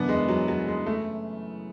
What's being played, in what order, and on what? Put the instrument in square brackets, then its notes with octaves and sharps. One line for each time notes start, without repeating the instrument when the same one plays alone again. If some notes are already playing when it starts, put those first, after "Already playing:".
Already playing: [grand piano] F#2 C#3 E3 [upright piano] B3 D4
[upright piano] G#3
F#3
F#3
G#3
A3